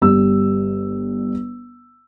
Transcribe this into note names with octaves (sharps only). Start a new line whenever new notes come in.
G1 G3 E6